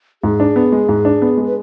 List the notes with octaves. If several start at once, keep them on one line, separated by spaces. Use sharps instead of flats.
G#2 G#4
D4
B3
G#3
G#2
D4
B3
G#3
B4